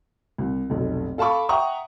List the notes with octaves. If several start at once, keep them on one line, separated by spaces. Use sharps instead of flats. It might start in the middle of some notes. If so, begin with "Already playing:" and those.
C2
F1 B1
A4 F5 A5 B5 C#6 D6
E5 F#5 G5 A#5 C#6 D#6